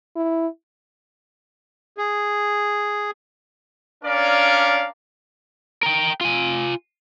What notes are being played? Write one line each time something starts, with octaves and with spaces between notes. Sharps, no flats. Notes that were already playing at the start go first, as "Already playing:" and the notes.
E4
G#4
C#4 D4 A#4 D5 F5
A#4 G5
F4 G#5